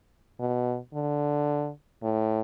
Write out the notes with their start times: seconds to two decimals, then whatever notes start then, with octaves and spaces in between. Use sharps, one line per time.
0.40 B2
0.94 D3
2.03 A2